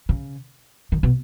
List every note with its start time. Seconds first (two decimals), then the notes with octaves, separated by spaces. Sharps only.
0.09 C#3
0.92 D#3
1.03 B2